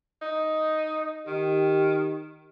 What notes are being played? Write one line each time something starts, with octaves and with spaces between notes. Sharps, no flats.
D#4
D#3 G4